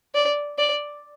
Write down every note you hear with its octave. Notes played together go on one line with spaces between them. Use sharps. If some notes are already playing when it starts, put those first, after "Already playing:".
D5
D5